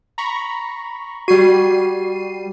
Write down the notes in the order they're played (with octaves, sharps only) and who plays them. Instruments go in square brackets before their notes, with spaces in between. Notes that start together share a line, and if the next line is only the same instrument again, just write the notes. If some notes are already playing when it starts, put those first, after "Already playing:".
[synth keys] A#5 B5 C#6
[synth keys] G3 C7 D#7 [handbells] F#4